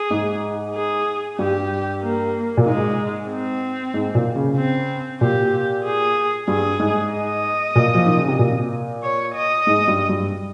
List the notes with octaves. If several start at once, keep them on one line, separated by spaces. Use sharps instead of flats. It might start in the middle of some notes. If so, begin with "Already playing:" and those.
Already playing: G#4
G#2
G#4
G2 G4
A#3
A#2
G#2 G#3
C4
G#2
A#2
C#3
C4
A#2 G4
G#4
G2 G#4
G#2
D#5
A#2
F3
D#3
C#3
C3
A#2
C#5
D#5
G#2
G2
G2